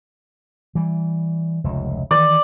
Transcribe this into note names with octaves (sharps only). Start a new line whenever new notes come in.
E3 G3
F1 C#2
D#3 E3 D5